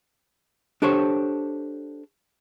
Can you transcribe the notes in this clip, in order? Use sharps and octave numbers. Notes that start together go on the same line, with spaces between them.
D4 G4 A4 C5 C#5